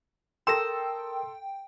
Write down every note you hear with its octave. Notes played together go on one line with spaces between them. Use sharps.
A4 A#4 G5 C6 D#6 E6 A#6 E7